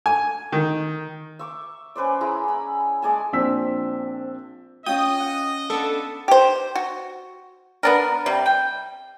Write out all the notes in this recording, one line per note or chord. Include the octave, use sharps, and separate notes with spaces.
G#5
D#3
E5 C#6 D6
C#4 B4 C5 D5
E4 G#4 A#5 B5
B5
G#3 D5 G#5 A5
A#1 C4 D4 E6 B6
C#4 F4 D#5 G5 D#6
F#5
B3 D4 A4
G4 C5
F#4
B3 D4 A#4
C3 G3
G5